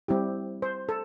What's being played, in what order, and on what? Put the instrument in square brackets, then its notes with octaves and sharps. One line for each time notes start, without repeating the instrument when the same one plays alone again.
[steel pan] G3 C4 E4 G4
C5
A4